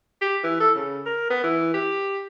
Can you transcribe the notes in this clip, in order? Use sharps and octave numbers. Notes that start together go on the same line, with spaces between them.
G4
E3
A4
C#3
A#4
B3
E3
G4